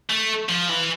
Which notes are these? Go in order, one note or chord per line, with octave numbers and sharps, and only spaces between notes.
A3
F3
E3